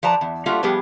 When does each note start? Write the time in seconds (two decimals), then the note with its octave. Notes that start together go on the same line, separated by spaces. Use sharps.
0.03 F3 B4 D5 A5 A#5
0.21 E2
0.46 G3 A3 A#3 F4 F#4
0.63 F3 G3 B3 G4 G#4